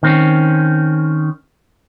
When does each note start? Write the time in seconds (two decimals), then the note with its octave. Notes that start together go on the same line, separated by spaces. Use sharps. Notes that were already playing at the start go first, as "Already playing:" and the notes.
0.03 D#3 C4 C#4